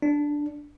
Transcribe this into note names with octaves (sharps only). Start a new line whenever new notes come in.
D4